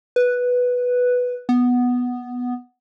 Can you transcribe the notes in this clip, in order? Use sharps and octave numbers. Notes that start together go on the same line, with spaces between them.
B4
B3